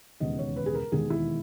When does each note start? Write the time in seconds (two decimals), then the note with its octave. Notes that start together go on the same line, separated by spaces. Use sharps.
0.20 E1 D#2 C#3 G#3 B3 D#5
0.39 C#5
0.56 B4
0.66 G#4
0.75 A#4
0.92 E1 D#2 D#3 G#3 B3 G#4
1.10 E4